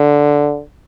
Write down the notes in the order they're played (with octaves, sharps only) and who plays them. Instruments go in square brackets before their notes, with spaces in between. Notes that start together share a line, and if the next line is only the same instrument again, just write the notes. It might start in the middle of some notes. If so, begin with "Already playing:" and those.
Already playing: [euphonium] D3